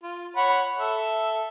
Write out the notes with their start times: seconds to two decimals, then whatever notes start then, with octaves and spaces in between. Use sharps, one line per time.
0.03 F4
0.36 C#5 F#5 B5
0.79 A4 E5